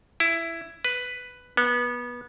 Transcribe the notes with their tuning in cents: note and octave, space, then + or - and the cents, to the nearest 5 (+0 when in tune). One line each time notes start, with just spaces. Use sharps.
E4 +10
B4 +5
B3 -25